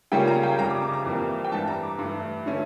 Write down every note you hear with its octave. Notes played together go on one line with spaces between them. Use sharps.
C#3 G3 A#3 C#4 F4 G5
A#5
G5
F2 C#3 G3 A#5
D6
D6
A#5
F2 E3 G3 A#3
G5
G2 E3 G3 D4 A5
A#5
D6
G2 E3 A3
D3 A3 C#4